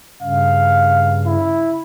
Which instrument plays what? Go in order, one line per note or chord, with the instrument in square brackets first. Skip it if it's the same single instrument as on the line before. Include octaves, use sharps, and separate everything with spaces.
[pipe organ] G2 C#3 [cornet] F5
[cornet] E4